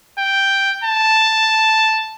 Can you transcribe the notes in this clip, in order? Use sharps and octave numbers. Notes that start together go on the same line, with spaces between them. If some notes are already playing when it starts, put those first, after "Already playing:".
G5
A5